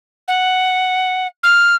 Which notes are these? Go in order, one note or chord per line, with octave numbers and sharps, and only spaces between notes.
F#5
F6